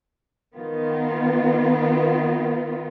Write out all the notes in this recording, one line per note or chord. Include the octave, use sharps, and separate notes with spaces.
D#3 B3 F4